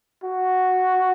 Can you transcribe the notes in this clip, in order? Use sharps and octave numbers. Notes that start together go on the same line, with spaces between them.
F#4